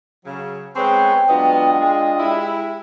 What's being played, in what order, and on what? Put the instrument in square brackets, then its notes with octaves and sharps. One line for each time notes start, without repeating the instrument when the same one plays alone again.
[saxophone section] C#3 F#3
[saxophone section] G#3 B3 C4 [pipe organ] G#4 B4 C#5 [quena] G5
[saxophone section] F#3 G#3 B3 [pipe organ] D4 F4 D#5
[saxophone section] G#3
G3 G#3 E4